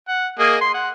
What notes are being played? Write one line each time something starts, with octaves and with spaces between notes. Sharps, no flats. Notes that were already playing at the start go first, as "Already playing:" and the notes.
F#5
A#3 G#4 D#5
C6
F#5